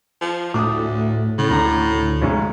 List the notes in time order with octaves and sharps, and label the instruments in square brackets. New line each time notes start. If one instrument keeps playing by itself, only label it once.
[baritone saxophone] F3
[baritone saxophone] D2 [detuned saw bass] A2 [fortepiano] D6 D#6
[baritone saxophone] A2 [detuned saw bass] C#3
[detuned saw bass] D2 [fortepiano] D3 A#5
[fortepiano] B1 G#2 C#4